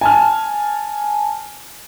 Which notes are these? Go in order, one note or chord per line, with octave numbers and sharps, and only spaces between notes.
G#5 A5 F6